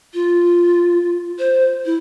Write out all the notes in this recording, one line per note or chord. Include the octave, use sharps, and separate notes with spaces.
F4
C5
E4